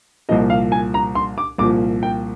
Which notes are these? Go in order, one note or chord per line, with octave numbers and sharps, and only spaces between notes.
C2 A#2 F3 D#5
F5
G#5
A#5
C6
D6
C2 A#2 F3 D6
G5